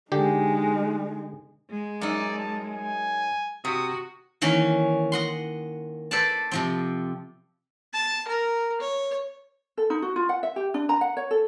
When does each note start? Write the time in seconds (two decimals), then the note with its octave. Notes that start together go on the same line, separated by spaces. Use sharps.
0.12 D3 G#3 D#4 G4
1.70 G#3
2.01 F#2 D#4 D5
2.38 A5
2.70 G#5
3.65 C3 F#4 D#6
4.42 D#3 E3 A#3 C#4
5.12 D#5 F#5 C6
6.11 A4 B4 C5 D5 A5
6.51 C3 F3 C4
7.93 A5
8.28 A#4
8.81 C#5
9.77 A4
9.90 D#4
10.02 F#4
10.16 F4
10.29 F#5
10.43 E5
10.56 G4
10.74 D4
10.89 A#5
11.01 F#5
11.17 C#5
11.31 A4